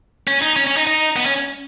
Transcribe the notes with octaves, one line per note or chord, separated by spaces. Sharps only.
C#4
D#4
C#4
C#4
D#4
D#4
B3
C#4